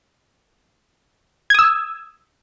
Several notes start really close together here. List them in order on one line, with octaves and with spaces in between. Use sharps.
G#6 D#6 E6